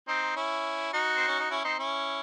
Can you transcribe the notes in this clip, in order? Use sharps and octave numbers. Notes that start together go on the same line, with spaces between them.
C4 D#4
C#4 E4
D#4 F#4
C4
C#4
D#4
C#4 E4
C4 D#4
C#4 E4